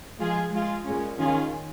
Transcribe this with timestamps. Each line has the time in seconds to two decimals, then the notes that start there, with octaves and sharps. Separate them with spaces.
0.19 F3 G#3 F4 G#4
0.51 G#3 F4 G#4
0.86 A#2 G#3 C#4
1.19 D#3 C#4 F4 G#4